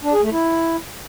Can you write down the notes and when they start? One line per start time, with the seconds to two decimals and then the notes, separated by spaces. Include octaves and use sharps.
0.04 D4
0.13 G#4
0.22 A3
0.32 E4